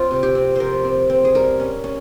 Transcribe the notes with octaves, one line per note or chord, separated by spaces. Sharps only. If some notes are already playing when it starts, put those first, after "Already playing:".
Already playing: C4 F4
C3
G4
C4
F3 A#4 C5
C4
C4
G#4
G3 A#4
C#4
C#4